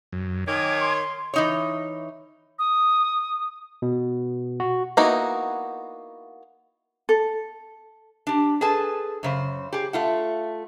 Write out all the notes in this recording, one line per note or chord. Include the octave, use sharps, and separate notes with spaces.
F#2
D#3 C#5 G#5 D6
C6
E3 D#4 C#5
D#6
B2
F#4
A#3 B3 D#4 E4 F#4
A4
D4 G4
G#4 A4 B4 G#5 A5
F#2 C#3 C5
G4 G#4
A3 F4 F#5